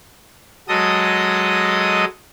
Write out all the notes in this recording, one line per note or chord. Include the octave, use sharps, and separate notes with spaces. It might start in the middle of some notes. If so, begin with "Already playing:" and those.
F#3 G#3 A4 D#5 D#6